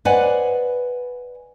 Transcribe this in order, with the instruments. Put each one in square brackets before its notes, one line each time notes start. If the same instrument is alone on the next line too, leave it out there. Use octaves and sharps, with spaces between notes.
[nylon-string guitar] B4 C5 D5 D#5 F#5 G#5